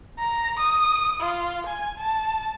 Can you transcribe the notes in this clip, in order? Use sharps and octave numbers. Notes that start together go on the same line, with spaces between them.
A#5
D#6
F4
G#5
A5